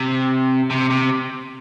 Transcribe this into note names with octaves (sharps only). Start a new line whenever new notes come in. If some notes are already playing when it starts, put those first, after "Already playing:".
Already playing: C3
C3
C3